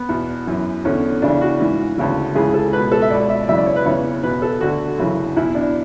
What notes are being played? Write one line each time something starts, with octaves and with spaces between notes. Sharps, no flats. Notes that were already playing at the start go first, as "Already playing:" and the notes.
Already playing: B3
E2 B2
F#2 E3
E2 D3 C#4
E2 C#3 E3 D4
F#4
G#2 E3
D2 C#3 E3
C#2 C#3 E3 G#4
A4
C#2 B2 B4
A4
E5
C#2 B2 D5
E5
D5
F#2 C#3 E3 E5
D5
C#5
B4
E2 C#3 E3 C#5
E2 B2 B4
A4
D2 D3 F#4
F#2 C#3 E3
E2 B2 E4
D4